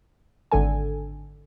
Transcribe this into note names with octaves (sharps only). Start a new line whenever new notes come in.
G#1 D3 A4 G#5